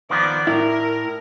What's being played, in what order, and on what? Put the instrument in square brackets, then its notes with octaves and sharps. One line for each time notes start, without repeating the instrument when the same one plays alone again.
[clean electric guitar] D#3 F3 B3 [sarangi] D5
[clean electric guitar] A2 [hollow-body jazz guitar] E4 [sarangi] A#4